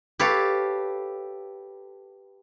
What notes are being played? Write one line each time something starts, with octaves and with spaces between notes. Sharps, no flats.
G4 A4 B4 C#5 F5